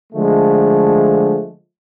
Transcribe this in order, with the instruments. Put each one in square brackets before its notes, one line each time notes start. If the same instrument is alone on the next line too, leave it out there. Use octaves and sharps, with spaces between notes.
[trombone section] D3 F3 G#3 A3